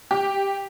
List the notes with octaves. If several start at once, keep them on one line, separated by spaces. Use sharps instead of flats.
G4